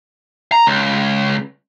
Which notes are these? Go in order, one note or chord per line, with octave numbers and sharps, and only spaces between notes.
A#5
C#2